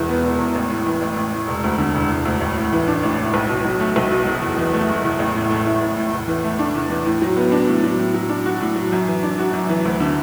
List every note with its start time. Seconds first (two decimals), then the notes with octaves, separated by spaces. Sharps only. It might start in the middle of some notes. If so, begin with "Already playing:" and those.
Already playing: E1 E2 E3
0.09 B3
0.24 E1
0.39 E2
0.55 A1
0.70 A2
0.86 E3
1.02 A1
1.17 A1
1.33 A2
1.47 E1
1.64 D2
1.78 D3
1.95 E1
2.11 E1
2.25 D2
2.41 A1
2.57 A2
2.72 E3
2.88 D4
3.03 A1
3.18 A2
3.34 B1
3.49 B2
3.64 F#3
3.80 A3
3.96 B1
4.12 B2
4.26 F#1
4.42 E2
4.58 E3
4.73 A3
4.89 F#1
5.05 E2
5.19 A1
5.35 A2
5.50 A3
5.66 E4
5.82 A1
5.97 A2
6.13 E2
6.28 E3
6.44 A3
6.59 D4
6.75 E2
6.90 E3
7.06 A2
7.22 F#3
7.37 B3
7.52 D4
7.67 A2
7.84 F#3
7.99 A2
8.14 F#3
8.29 D4
8.46 F#4
8.61 A2
8.76 F#3
8.92 F#2
9.07 E3
9.23 D4
9.39 F#4
9.53 F#2
9.69 E3
9.85 D2
10.00 D3